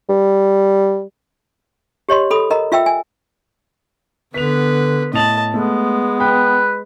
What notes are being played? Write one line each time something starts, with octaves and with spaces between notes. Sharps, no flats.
G3
G4 C#5 D#5 C6
A4 B5 D#6
A#4 D#5 A#5
F4 E5 G5 E6
G#5
D3 B3 B4 B6 F7
A2 D#5 A5 F7 F#7
G#3 A3 B3
B4 G5